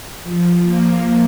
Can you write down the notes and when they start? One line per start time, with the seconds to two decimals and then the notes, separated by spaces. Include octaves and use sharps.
0.24 F3
0.61 A#3